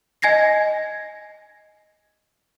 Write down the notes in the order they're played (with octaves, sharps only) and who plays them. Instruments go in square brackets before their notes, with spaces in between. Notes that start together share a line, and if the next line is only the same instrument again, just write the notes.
[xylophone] D#5 G#5 G#6 A#6 C7